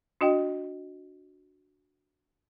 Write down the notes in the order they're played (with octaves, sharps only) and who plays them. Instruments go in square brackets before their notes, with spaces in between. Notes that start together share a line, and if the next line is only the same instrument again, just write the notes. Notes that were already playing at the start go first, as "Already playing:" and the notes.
[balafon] D4 F#4 D#5 G5